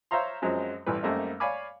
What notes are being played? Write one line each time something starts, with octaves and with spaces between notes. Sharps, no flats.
C5 C#5 E5 F5 A#5 C6
F#2 F3 F#3 G#3 C4
A1 E3 G3 B4
F#2 G3 A3 A#3 C4 D#4
C#5 D5 F5 G#5 B5 D6